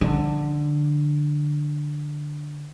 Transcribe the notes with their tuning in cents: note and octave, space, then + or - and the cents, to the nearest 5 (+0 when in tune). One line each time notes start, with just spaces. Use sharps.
D3 +10 F3 +0